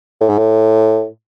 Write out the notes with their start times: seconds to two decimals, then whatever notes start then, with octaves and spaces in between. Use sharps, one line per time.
0.21 A2
0.29 G#2
0.38 A2